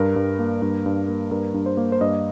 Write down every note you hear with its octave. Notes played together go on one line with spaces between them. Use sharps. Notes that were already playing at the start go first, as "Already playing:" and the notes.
Already playing: G2 A#4
G2
A#3
G2
G2
A#3
G2 A#4
G2
C5
A#3
C5
G2 D#5